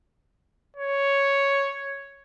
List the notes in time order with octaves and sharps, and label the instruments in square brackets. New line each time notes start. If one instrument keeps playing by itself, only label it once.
[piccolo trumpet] C#5